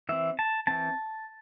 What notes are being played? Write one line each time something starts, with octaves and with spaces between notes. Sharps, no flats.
E3 C4 E5
A5
E3 C4 A5